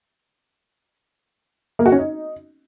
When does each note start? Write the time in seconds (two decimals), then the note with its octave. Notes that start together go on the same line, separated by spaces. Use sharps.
1.79 A#3
1.86 F#4
1.92 C#4
1.99 D#4